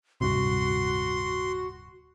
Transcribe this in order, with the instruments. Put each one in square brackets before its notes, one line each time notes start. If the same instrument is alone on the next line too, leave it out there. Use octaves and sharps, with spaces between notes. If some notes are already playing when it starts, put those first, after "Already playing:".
[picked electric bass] D1 G2 C3 [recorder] F#4 [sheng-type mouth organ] C6